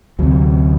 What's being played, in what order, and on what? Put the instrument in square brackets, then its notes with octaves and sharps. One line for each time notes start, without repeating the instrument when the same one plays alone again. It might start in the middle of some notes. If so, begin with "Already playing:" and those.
[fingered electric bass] D2 C3 F#3